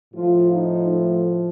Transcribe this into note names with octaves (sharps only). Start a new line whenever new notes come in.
A2 F3 F4
D#4
A3